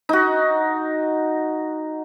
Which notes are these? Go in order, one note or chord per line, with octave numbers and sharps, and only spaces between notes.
D#4 F#4